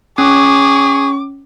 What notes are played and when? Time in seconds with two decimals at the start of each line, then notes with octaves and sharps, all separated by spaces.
0.18 C#4 G#4 C#6 D6